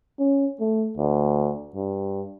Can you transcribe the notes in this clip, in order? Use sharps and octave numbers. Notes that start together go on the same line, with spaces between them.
C#4
A3
D2
G2